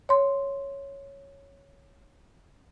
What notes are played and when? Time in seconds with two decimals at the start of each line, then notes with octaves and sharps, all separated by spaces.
0.09 C#5 C6